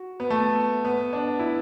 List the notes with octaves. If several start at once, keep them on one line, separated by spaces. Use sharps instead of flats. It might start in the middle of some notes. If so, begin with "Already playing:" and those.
Already playing: F#4
B3
A3
B3
D4
E4